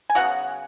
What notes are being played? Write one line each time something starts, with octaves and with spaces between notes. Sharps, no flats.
G#5
C#3 F#3 B3 F#4 F#5